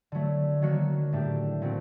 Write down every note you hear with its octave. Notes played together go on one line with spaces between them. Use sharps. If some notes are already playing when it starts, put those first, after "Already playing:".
D3 F#3 A3
D#3 F#3 A#3 D4 F#4
A2 A3 D4 G4
A#2 A3 C4 F#4